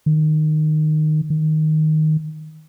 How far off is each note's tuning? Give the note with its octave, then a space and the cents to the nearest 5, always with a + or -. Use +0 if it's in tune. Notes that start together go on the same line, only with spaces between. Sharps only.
D#3 -15
D#3 +0